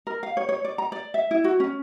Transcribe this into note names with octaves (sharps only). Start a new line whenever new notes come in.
A#4
F5
C#5
C#5
D5
A#5
D5
E5
E4
F#4
C#4